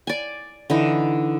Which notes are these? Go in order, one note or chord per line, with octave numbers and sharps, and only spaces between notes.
D5 G#5
D3 E3 D#4